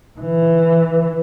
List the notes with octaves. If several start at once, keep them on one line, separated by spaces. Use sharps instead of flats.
E3